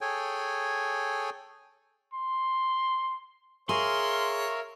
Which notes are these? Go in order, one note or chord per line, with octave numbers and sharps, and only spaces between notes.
G#4 A4 C#5 G5 G#5
C6
G#4 A#4 C#5 E5 F5 C6